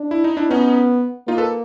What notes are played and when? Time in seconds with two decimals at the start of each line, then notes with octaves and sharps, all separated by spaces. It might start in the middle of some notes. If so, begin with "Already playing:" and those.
Already playing: D4
0.11 E4
0.24 D#4
0.37 D4 E4
0.50 B3 C#4 D#4
1.28 A#3 D#4 F4
1.38 A4 B4